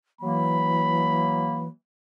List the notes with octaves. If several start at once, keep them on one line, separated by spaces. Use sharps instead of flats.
E3 F#3 A#3 B5